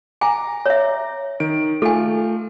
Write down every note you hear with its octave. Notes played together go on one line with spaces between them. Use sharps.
G#5 A#5 D6
C#5 E5
D#3 D7
A3 F4 A4 G#5